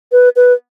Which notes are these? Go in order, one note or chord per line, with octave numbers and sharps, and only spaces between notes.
B4
B4